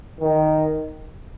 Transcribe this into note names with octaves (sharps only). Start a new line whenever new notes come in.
D#3